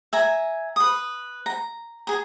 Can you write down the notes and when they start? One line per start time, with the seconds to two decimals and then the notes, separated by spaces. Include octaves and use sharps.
0.13 E5 G#5 A#5
0.76 B4 D#6
1.46 A#5
2.07 G#4 A#5